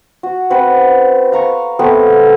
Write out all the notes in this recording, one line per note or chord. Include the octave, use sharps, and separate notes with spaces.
F#4
C4 F#4 B4 C5
F5 A#5 C#6
A3 B3 C4 A4